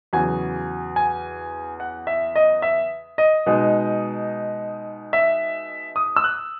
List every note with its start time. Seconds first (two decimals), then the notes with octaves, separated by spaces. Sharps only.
0.13 E2 C#3 F#3 G#5
0.96 G#5
1.80 F#5
2.07 E5
2.36 D#5
2.62 E5
3.18 D#5
3.46 B2 G#3 D#4
5.13 E5
5.96 D#6
6.16 E6
6.24 F#6